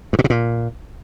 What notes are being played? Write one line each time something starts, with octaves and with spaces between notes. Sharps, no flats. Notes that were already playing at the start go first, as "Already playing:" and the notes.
G2
A#2
C3
A#2